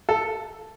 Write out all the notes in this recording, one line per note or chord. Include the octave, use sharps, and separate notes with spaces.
A4